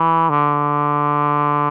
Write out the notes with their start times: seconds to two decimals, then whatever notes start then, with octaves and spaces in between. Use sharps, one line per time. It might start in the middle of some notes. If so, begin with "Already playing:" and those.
Already playing: E3
0.30 D3